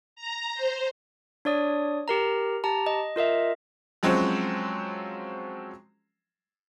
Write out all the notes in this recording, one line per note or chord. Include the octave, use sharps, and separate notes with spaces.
A#5
C5
D4 C#5 D5 D#6
G4 A#4 A#5
G4 A5 A#5
D#5
F4 A#4 D#5 E5
F3 F#3 G#3 C4 C#4